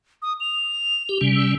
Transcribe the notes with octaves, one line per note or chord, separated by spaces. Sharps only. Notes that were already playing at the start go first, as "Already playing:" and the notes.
D#6
F7
G4
C3 G3 C#4
E6